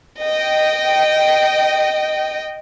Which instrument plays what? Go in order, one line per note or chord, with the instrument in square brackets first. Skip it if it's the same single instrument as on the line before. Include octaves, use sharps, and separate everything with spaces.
[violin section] D#5 G5